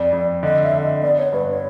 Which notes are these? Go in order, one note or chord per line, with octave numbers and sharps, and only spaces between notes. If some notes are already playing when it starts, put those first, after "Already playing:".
Already playing: F2 D5
F2
D3 D#5
E5
D3
D#5
B3 D5
C#5
G2 B4
C#5